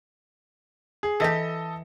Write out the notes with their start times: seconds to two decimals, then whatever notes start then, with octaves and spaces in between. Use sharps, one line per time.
1.03 G#4
1.20 E3 G4 A4 D#5